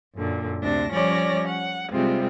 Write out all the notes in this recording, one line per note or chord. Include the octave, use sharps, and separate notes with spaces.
F#2 A#2 D3
D2 C3 D4 A#6
F3 G3 C#4 C#5 D5 A#6
F#5
C3 G3 G#3 C4 F4